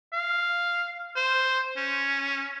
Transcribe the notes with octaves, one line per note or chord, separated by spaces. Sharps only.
F5
C5
C#4